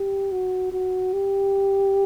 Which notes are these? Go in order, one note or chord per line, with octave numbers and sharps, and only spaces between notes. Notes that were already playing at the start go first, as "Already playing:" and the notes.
Already playing: G4
F#4
F#4
G4